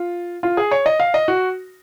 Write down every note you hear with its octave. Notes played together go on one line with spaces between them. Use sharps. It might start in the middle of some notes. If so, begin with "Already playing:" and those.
Already playing: F4
F4
G#4
C#5
D#5
F5
D#5
F#4